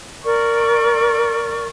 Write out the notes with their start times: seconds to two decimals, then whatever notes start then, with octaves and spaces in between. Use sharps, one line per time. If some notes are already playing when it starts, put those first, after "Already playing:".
0.24 A#4 D5 C#6